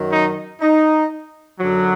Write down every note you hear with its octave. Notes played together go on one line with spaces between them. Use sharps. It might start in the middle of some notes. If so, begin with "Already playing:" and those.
Already playing: F#2 D#3 F#3
D#4
D#4
F#2 D3 F#3